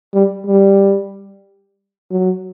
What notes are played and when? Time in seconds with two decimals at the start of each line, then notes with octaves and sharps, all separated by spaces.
0.14 G3
0.47 G3
2.11 F#3